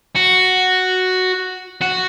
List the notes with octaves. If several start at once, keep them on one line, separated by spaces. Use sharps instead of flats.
F#4
F#4